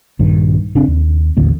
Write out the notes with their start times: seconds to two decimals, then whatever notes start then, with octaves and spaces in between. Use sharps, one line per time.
0.19 A#1 G2 D#3
0.75 G1 C#3 C4 D4
0.88 D#2
1.37 A1 D#2 D3 A#3